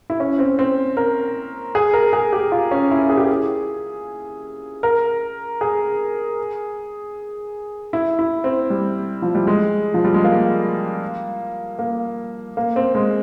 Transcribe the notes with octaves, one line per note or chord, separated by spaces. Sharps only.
E4
C#4
C4
C4
A#4
G#4
A#4
G#4
G4
F4
C#4
E4
G#4
G4
G#4
A#4
G#4
E4
E4
C4
G3
F3
G3
G#3
F3
G3
G#3
A#3
A#3
A#3
C4
G#3